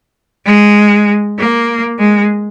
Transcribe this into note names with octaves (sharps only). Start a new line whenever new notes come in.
G#3
A#3
G#3